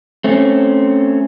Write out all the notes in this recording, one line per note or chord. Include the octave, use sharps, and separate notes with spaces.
A3 C4 C#4